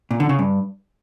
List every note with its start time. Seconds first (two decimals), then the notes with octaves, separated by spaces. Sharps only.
0.11 A#2
0.20 D3
0.29 C#3
0.39 G2